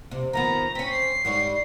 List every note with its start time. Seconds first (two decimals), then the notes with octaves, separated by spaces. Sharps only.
0.11 C3
0.33 D#3 F3 B3 A#5
0.75 C4 C#4 B6
0.90 C7
1.25 G#2 G3 C#5